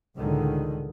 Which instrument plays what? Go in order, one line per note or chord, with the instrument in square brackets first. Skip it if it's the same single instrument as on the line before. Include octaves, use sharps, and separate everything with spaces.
[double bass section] C#2 A2 D3 D#3